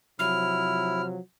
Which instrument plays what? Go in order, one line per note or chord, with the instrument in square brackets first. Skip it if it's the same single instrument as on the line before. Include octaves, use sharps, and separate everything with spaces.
[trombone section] C3 F3 F#3 [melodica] E4 [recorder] F6